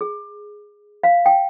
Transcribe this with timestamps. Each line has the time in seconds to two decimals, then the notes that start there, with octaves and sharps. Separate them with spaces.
0.01 G#4
1.03 F5
1.26 G5